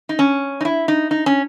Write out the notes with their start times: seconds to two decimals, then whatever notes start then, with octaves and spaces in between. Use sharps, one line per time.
0.09 D#4
0.19 C#4
0.61 D#4
0.65 E4
0.88 D#4
1.11 D#4
1.26 C#4